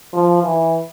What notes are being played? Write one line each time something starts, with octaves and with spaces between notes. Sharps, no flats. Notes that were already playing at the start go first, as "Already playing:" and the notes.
F3
E3